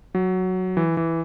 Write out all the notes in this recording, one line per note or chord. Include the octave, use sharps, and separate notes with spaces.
F#3
E3
E3